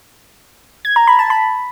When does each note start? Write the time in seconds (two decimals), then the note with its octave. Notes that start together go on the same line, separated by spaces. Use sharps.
0.85 G#6
0.96 A#5
1.07 B5
1.19 A5
1.30 B5